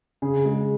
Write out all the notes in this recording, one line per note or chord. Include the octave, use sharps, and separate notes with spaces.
C#3 G#4
G#3